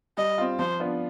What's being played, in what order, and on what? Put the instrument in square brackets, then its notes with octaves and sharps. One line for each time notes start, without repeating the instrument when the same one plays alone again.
[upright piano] G3 [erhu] D#5
[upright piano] C4 F4
[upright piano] F3 [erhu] C5
[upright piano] B3 D4 F4